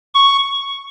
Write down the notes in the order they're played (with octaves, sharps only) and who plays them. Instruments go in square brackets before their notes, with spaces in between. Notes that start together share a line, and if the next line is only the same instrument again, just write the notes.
[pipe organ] C#6